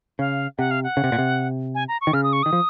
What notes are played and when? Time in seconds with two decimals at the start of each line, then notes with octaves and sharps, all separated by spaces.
0.19 C#3 F5
0.58 C3 F#5
0.71 F5
0.83 F#5
0.97 C#3
1.04 C3
1.12 A#2
1.19 C3
1.75 G#5
1.88 A#5
2.01 C#6
2.07 D#3
2.13 C#3 F6
2.23 D#6
2.33 C#6
2.43 D#3 D#6
2.53 F3